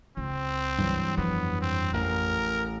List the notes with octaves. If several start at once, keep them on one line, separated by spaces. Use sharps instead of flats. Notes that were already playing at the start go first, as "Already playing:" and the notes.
C#2 C4
G2 E3 F#3
F2 B3
C4
A1 A#4